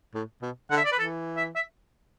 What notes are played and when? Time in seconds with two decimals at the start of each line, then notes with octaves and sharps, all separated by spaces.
0.15 A2
0.42 B2
0.70 D3 F#5
0.77 E5
0.85 D5
0.92 B4
0.99 E3 A4
1.37 E5
1.56 E5